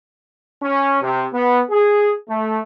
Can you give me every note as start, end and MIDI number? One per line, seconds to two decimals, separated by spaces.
0.62 0.97 61
1.02 1.25 48
1.33 1.61 59
1.70 2.11 68
2.29 2.59 57